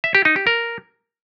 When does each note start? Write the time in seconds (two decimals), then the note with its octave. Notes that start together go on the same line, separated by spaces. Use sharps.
0.04 E5
0.15 G4
0.25 D#4
0.36 G4
0.47 A#4